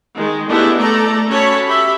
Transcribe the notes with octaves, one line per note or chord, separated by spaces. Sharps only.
D#3 G#3
G#3 A3 B3 D4 E4 G4
A3 A4 D5 A#5
C#4 F#4 A4 C#5 A5 B5
G4 E5 B5